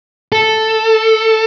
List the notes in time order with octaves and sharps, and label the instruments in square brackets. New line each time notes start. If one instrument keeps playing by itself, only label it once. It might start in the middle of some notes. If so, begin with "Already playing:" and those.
[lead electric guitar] A4